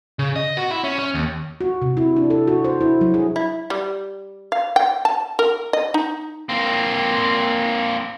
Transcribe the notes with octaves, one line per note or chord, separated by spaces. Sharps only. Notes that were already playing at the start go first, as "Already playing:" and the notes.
C#3
D#5
F#4
E4
C#4
C#4
D#2
F#4
C3
E4
D4
A4
F#4
C5
E4
F#3
G#4
E4
G3
F5
G5
A5
A#4
D#5
D#4
A#3 C4